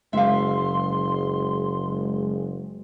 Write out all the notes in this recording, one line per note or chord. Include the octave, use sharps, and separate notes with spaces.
F#1 G#3 E5 F5 C6